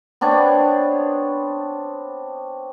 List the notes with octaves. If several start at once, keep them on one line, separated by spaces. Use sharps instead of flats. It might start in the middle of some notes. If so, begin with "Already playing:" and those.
B3 C4 D4 C#5